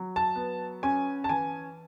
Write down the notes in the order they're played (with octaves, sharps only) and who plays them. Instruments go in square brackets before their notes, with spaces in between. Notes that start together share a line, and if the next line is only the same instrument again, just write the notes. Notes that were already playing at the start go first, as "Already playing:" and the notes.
Already playing: [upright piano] F#3
A5
B3
C#4 G#5
A5
E3 G#5